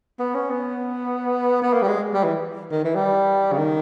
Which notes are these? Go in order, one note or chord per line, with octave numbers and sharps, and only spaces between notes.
B3
C#4
B3
B3
A#3
G3
G#3
G3
E3
D#3
E3
G3
C#3
D#3